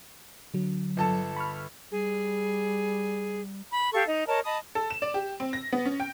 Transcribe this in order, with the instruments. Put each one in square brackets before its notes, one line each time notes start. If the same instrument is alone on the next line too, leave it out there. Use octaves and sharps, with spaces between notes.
[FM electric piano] D3 F#3
[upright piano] G1 A4 A5
[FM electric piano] B5 C#6 F6
[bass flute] G3 [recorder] G#4
[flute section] B5
G4 A4 F5 C#6
D#4
A#4 C#5 D#5 A5
D#5 A5 B5 D#6
[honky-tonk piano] A4
E7
D5
G4
C4
A#6
B3
C#4
G5